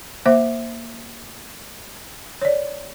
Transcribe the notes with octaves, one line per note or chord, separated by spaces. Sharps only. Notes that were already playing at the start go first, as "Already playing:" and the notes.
A#3 C5 E5 D6
C#5 D5